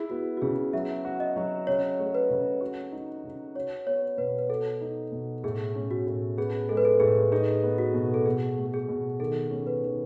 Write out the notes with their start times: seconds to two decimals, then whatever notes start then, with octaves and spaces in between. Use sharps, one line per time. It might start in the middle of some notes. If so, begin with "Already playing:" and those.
Already playing: E4 G#4
0.10 B3 F#4
0.37 F#4
0.42 C#3 G#4
0.73 F#3 E5
1.05 F#4
1.20 D#5
1.36 F#3
1.67 C#3 C#5
1.99 A3
2.15 B4
2.30 C#3
2.61 F#4
2.92 D#4
3.24 C#3
3.55 F#4 C#5
3.86 B3 C#5
4.18 B2 B4
4.38 B4
4.49 F#4 A4
4.81 D#4
5.12 B2
5.44 A2 G#4
5.76 C#4
5.91 F#4
6.07 A2
6.37 B3 G#4
6.69 G#3 A4
6.77 B4
6.85 A4
7.00 A2 G#4
7.32 D#4 G#4
7.63 B3
7.78 F#4
7.94 B2
8.14 A4
8.26 B2 G#4
8.57 A3
8.74 G#4
8.89 B2
9.20 D#3 A4
9.51 C#4
9.67 B4
9.83 D#3